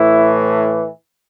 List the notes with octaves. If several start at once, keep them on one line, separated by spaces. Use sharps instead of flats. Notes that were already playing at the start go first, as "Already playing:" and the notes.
Already playing: A2 E3 E4